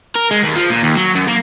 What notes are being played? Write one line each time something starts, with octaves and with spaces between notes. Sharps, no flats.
A#4
G#3
D#2
F3
A#2
D#2
F#3
F#2
A#3